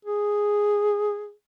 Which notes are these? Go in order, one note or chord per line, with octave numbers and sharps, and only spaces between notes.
G#4